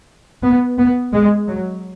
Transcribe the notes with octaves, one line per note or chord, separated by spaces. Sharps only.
B3
B3
G#3
F#3